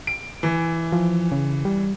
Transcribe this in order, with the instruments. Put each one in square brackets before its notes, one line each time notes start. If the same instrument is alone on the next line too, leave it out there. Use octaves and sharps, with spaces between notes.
[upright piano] D7
E3
[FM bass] F3
C#3
G3